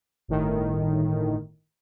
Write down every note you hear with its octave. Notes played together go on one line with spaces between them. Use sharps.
G1 A2 D#3